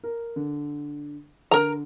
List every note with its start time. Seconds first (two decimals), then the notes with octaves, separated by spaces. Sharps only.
0.04 A#4
0.36 D3
1.51 D3 A#4 A#5